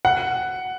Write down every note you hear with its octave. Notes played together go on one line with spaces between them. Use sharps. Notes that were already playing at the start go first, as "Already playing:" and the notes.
F#5